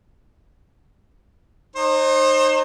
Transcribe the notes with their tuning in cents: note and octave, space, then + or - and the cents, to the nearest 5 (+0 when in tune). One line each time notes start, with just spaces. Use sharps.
D#4 -25 C5 +30